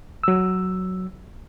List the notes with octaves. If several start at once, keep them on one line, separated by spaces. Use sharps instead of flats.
F#3 E6